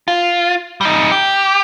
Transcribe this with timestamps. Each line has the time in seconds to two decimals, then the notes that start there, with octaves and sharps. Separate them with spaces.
0.08 F4
0.81 G3 D#4
1.12 G4